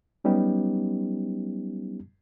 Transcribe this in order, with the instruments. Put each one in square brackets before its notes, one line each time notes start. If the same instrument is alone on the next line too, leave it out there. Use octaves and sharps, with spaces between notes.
[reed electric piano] F#3 G3 B3 C#4 D#4 G4